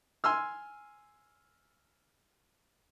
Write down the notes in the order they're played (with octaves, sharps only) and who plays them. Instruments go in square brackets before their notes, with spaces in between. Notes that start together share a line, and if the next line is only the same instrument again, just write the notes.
[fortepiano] G#5 C6 E6 F6